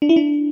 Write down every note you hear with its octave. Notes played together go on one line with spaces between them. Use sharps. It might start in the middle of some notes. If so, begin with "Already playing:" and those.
D4
E4
D4